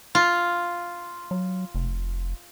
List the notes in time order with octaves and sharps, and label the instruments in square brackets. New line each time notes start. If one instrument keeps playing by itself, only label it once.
[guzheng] F4
[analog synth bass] F#3
F1